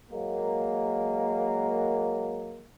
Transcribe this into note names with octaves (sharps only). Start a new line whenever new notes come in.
F#3 G#3 A#3